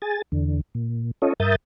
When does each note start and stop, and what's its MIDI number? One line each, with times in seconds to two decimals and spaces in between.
0.02 0.22 68
0.02 0.22 80
0.02 0.22 93
0.32 0.61 40
0.32 0.61 50
0.75 1.11 46
1.22 1.33 61
1.22 1.33 65
1.22 1.33 69
1.22 1.33 73
1.22 1.33 75
1.40 1.56 43
1.40 1.56 70
1.40 1.56 76
1.40 1.56 87
1.40 1.56 91
1.40 1.56 93